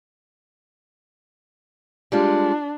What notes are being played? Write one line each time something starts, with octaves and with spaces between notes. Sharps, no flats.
G3 G#3 D4 F4